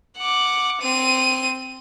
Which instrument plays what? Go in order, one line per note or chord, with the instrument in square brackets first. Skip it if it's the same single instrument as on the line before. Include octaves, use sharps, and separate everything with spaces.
[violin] F#5 D6
C4 D#7